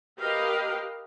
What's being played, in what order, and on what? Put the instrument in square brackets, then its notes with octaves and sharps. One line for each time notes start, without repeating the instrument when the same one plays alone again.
[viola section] G4 A#4 B4 D#5 F5